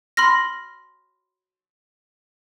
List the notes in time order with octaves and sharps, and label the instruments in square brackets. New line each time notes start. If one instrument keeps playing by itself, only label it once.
[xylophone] B5 C6 F6 A#6